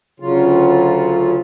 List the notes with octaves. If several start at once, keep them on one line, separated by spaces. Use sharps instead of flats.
D2 C#3 F#3 F4